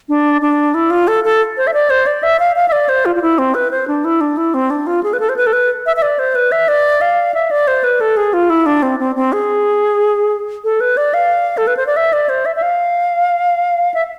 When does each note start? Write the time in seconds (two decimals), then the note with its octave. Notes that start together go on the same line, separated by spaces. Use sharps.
0.08 D4
0.41 D4
0.74 E4
0.90 F4
1.07 A4
1.24 A4
1.57 C5
1.67 E5
1.73 D5
1.90 C5
2.06 D5
2.23 E5
2.39 F5
2.56 F5
2.68 E5
2.72 D5
2.89 C5
3.05 F4
3.15 F4
3.22 E4
3.38 C4
3.54 B4
3.71 C5
3.88 D4
4.04 E4
4.21 D4
4.37 E4
4.54 C4
4.70 D4
4.86 F4
5.03 G#4
5.13 B4
5.20 A4
5.29 C5
5.36 B4
5.46 A4
5.53 B4
5.86 E5
5.96 E5
6.02 D5
6.19 C5
6.35 B4
6.52 E5
6.68 D5
7.01 F5
7.34 E5
7.51 D5
7.67 C5
7.84 B4
8.00 A4
8.17 G#4
8.33 F4
8.50 E4
8.66 D4
8.82 C4
8.99 C4
9.16 C4
9.32 G#4
10.64 A4
10.80 B4
10.97 D5
11.14 F5
11.57 A4
11.67 B4
11.77 C5
11.87 D5
11.96 E5
12.13 D5
12.29 C5
12.45 E5
12.56 E5
12.62 F5
13.94 E5